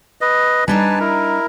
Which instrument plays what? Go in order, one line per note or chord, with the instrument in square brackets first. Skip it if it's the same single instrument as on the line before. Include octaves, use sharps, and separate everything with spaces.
[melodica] B4 D#5
[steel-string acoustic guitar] G3 D4 D#4 [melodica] B4 G#5 A5
[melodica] E4 A#4